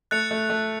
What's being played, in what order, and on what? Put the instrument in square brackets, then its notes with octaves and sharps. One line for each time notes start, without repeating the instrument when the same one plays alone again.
[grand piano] A3 [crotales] F#6 A6 C#7 F7
[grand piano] A3
A3